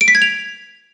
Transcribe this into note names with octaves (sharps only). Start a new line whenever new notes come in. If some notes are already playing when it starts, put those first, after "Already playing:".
D7
B6
G#6
F7